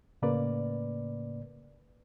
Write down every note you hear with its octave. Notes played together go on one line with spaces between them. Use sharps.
A2 C#3 A#3 B4 D5